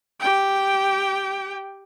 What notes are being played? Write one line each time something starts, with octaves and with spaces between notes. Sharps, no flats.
G4 G5